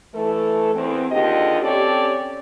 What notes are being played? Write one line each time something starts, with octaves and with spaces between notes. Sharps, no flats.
E3 A3 A4
E2 C4
D#2 D3 F4 G4 G#4 D#5
C4 C#4 G4 A4 C#5 D5